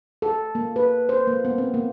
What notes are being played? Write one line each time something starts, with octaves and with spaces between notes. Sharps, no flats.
A4
A#3
B4
C5
A#3
B3
C4
A#3